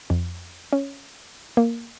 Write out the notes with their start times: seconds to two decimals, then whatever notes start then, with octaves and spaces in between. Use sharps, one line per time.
0.10 F2
0.73 C#4
1.57 A#3